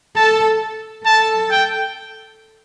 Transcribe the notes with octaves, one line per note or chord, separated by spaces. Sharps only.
A4 A5
A4 A5
G5